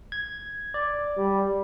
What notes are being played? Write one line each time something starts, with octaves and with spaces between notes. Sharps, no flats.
G#6
D5
G3